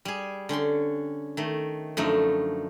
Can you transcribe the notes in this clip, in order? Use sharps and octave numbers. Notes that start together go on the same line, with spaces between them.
G3 G#4
D3 C#4 G5 C6
D#3 A3
F#2 D3 F3 A3 D#4